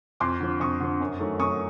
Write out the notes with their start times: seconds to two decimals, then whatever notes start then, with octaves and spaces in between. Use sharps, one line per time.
0.20 F2 C6 D6
0.40 D3 F3
0.60 F2 C#6 D#6
0.80 D3 F3
1.00 F#2
1.20 D#3 F#3 A3
1.40 F#2 C#6 D#6